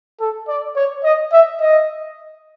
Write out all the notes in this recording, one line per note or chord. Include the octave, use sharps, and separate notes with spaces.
A4
D5
C#5
D#5
E5
D#5